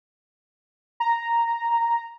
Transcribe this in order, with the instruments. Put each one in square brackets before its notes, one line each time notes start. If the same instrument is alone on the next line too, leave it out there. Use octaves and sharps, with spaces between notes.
[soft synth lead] A#5